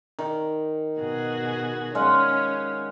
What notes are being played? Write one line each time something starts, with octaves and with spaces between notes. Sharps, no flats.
D#3
B2 F#4 G#4
G#3 C#4 F5 F#5